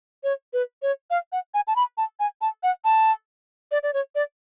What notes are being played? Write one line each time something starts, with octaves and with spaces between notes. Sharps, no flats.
C#5
B4
C#5
F5
F#5
G#5
A5
B5
A5
G#5
A5
F#5
A5
D5
D5
C#5
D5